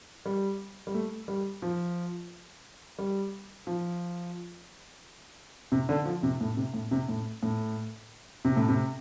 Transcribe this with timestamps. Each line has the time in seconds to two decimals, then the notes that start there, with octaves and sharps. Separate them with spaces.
0.26 G3
0.87 G3
0.94 A3
1.28 G3
1.62 F3
2.99 G3
3.67 F3
5.72 C3
5.89 D3
6.05 F3
6.23 C3
6.41 A2
6.57 C3
6.74 A2
6.91 C3
7.08 A2
7.43 A2
8.45 C3
8.56 A2
8.69 C3